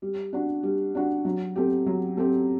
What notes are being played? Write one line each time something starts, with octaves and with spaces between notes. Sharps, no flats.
G3
D4 F#4
G3
D4 F#4
F#3
A3 C4 G4
F#3
A3 C4 G4